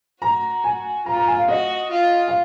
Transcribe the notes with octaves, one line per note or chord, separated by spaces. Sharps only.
F#4 A#5
G#5
F4 A#5
A#5
G#5
F5
F#4 D#5
F4
F5